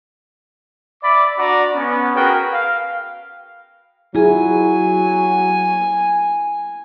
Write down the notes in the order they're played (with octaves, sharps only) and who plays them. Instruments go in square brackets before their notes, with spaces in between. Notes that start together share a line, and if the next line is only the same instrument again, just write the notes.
[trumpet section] D5 E5 B5 D6
D4 F#4 D5 A#5 D6
B3 C#4
F#4 G#4 A#4 B4 G5
F5
[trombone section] F#3 [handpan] E4 [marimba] F4 G#4 [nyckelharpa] G#5